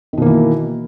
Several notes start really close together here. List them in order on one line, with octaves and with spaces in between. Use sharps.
D#3 B2 A#3 E3